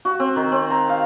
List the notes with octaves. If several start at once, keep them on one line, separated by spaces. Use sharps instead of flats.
F#4
C4
D#3
C4
A#5
F5